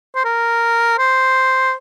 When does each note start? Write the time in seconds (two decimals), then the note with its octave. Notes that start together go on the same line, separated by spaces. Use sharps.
0.16 C5
0.25 A#4
0.98 C5